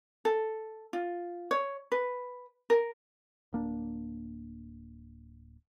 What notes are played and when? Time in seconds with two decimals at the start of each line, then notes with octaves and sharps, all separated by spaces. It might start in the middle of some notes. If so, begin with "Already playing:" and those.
0.25 A4
0.93 F4
1.51 C#5
1.92 B4
2.70 A#4
3.53 D1 A#3 D4